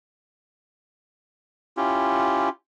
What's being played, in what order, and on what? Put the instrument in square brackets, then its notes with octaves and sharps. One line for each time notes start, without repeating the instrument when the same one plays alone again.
[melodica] C#4 E4 F4 G4